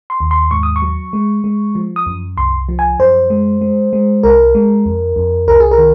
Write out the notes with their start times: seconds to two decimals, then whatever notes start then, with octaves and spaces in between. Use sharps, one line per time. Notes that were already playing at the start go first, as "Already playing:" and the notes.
0.10 C6
0.20 D#2
0.31 C6
0.51 G#2 C#6
0.63 D#6
0.76 C#6
0.82 F#3
1.13 G#3
1.44 G#3
1.75 F3
1.96 D#6
2.06 F#2
2.37 C2 C6
2.69 F3
2.79 G#5
2.99 F#2 C5
3.30 G#3
3.61 G#3
3.93 G#3
4.23 C2 A#4
4.55 G#3
4.86 F2
5.16 F2
5.47 C2 A#4
5.60 G#4
5.71 A#4
5.78 D#3